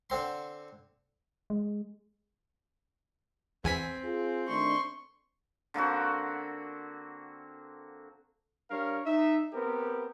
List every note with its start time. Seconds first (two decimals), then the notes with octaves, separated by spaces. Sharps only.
0.10 D3 C4 C6
1.50 G#3
3.64 E2 C4 G#5 B6
4.04 F4 G#4
4.48 D#3 A3 D4 C6 C#6
5.74 D3 A#3 C4 F#4
8.71 G3 D4 A#4 C#5 F5
9.05 D#4 E5
9.53 B3 C4 G4 A#4